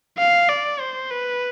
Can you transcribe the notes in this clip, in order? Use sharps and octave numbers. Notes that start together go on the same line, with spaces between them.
F5
D5
C5
B4